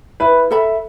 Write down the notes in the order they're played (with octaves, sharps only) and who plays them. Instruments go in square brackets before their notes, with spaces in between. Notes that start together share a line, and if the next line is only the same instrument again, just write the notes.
[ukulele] E4 [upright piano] B4
[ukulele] A4 E5 B5